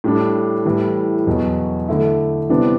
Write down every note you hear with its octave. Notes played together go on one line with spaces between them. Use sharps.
A2 G3 D4
A2 E3 G3
E2 B2 F#3
D3 A3 E4
C3 E3 G3 B3 D4